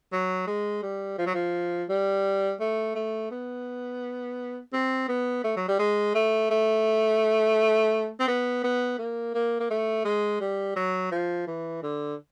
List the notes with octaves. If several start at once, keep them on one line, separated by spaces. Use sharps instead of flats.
F#3
G#3
G3
F3
F#3
F3
G3
A3
A3
B3
C4
B3
A3
F#3
G3
G#3
A3
A3
C4
B3
B3
A#3
A#3
A#3
A3
G#3
G3
F#3
F3
E3
D3